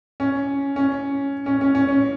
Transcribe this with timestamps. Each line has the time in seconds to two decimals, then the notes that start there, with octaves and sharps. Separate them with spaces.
0.20 C#4
0.76 C#4
1.46 C#4
1.61 C#4
1.75 C#4
1.89 C#4